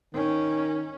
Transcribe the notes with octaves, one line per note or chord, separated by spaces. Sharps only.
D#3 C#4